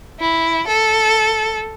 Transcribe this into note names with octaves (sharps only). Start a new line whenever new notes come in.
E4
A4